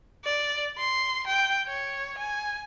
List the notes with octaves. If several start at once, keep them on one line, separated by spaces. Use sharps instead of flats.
D5
C6
G5
C#5
G#5